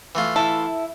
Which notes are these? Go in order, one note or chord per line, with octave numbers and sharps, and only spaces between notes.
E3 A3 F4
E4 A4